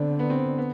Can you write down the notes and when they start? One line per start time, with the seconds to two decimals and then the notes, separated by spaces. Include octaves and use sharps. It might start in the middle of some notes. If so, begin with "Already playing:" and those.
Already playing: D3 B3 C4 D4
0.19 B3
0.30 C4
0.58 B3